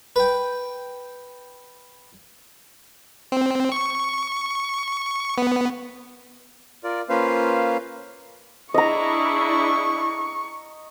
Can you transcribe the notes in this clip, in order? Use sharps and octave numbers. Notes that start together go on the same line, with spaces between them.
B4 G5
C4
C#6
B3
F4 A#4 D5
A#3 C#4 F4 B4 C5 F5
D4 E4 G#4 D#5 A#5 C#6